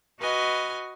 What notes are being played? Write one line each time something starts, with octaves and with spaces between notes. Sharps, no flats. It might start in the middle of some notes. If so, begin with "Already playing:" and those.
F#4 B4 D#5 G#5 F6